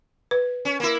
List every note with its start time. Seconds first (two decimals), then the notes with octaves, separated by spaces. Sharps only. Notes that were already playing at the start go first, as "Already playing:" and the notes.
0.31 B4
0.65 C#4
0.80 A#3 E4